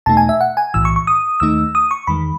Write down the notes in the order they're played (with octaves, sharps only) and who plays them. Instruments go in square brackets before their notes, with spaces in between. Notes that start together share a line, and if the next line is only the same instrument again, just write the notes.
[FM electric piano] E2 B2 A3 D#4 A5
G#5
E5
F#5
G#5
B1 A2 E3 E6
C#6
C#6
D#6
D#2 D#3 A3 D#4 E6
D#6
C#6
E2 D#3 G#3 B5